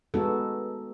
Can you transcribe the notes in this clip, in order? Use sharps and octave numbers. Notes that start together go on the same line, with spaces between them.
G#3 B3 D#4 F#4 A4